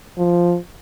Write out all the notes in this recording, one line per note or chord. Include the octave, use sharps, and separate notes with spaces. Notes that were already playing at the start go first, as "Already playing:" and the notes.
F3